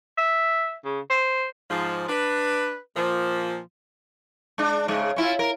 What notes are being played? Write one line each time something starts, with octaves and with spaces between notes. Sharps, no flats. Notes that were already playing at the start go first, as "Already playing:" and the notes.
E5
C#3
C5
G#2 F3
D4 B4
A#2 F3
G#3 D4
G#2 C#3 G#3
C#4 E4 F4
A#4